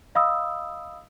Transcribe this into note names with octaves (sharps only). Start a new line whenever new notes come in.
D#5 F5 B5 D#6 E6